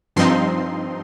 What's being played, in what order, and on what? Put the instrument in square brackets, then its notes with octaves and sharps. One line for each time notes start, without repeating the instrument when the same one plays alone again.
[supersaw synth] G2 F3 C4 D#4 C6